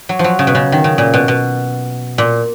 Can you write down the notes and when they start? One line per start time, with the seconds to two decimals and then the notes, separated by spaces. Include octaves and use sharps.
0.09 F#3
0.19 F3
0.24 F#3
0.39 C#3
0.47 B2
0.55 C#3
0.72 D#3
0.84 C#3
0.98 A#2
1.14 B2
1.28 B2
2.18 A#2